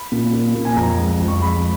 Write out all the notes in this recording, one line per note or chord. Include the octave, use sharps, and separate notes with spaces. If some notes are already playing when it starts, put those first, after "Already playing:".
Already playing: B5
A#2
A#2
A#2
G#5
F2 A#5
G#3
F2
C#6
G#3 B5